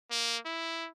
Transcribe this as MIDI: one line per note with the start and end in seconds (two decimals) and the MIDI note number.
0.11 0.38 58
0.45 0.88 64